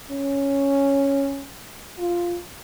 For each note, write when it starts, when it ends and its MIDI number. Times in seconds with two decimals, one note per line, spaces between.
0.10 1.50 61
1.99 2.37 65